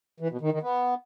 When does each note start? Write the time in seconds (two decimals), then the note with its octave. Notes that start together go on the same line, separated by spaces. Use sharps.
0.20 E3
0.31 B2
0.41 D#3
0.52 D#3
0.62 B3